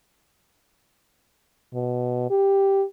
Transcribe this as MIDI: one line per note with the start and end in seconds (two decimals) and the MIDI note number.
1.74 2.26 47
2.30 2.84 67